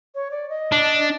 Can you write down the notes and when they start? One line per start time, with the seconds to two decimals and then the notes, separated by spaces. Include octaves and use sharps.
0.15 C#5
0.31 D5
0.50 D#5
0.72 D4